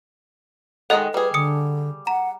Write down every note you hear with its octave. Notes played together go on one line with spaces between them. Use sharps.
D#3 G#3 A4 D#5 F#5
G3 G#4 B4
D3 D#6 C#7
F#5 A#5